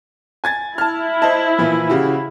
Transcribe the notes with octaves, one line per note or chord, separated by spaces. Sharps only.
G#5 G#6 A6
E4 A5 F6
C5 D#5 A5
A#2 E3 F3
C#3 F#4 G4